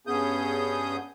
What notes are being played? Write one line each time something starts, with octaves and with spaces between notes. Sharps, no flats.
G2 B3 C#4 G#4 D#6 G6